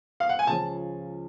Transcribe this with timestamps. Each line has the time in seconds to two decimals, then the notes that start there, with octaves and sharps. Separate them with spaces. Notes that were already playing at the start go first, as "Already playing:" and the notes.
0.20 F5
0.29 F#5
0.39 G#5
0.47 C#2 C#3 F3 G#3 C#4 A5